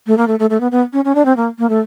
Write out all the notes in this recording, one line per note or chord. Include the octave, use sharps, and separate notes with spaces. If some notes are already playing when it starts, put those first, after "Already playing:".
A3
A#3
A3
A3
A3
B3
B3
C#4
C#4
D4
C4
A#3
A#3
A3